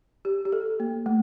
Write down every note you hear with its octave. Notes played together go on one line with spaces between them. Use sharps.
G4
G4
A4
A#3
A3